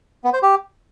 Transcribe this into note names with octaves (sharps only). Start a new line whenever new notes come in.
B3
C5
G4